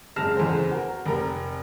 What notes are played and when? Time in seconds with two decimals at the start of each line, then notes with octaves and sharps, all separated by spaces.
0.16 F#1 G#3 A5 F6 A#6 E7
0.37 E2 C#3 A4 C5
0.71 F#4 A#4
1.06 F1 A#4